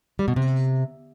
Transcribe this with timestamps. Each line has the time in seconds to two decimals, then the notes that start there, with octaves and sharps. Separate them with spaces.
0.19 G3
0.28 B2
0.36 C3